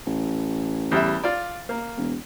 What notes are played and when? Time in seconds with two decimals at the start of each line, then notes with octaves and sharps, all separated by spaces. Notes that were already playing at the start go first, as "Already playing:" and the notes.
0.06 A1
0.92 E2 G3 E5
1.24 F4 D5
1.69 A#3
1.97 E1